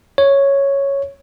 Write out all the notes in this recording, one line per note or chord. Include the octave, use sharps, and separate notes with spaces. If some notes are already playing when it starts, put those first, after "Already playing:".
C#5